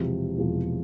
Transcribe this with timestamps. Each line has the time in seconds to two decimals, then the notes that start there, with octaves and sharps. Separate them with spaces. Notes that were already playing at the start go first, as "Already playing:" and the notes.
Already playing: E1 E2 C3 F3
0.37 E1 E2 C3 F3